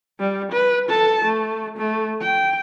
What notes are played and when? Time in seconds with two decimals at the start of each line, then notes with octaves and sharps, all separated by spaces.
0.20 G3
0.52 B4
0.90 A4 A5
1.26 A3
1.78 A3
2.22 G5